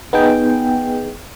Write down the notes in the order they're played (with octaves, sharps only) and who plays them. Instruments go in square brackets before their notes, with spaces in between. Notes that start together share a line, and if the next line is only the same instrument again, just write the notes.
[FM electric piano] B3 D#4 G#4 G5